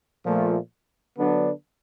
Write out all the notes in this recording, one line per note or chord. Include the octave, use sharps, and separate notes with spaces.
A#2 F3 A3
D3 F#3 B3 D4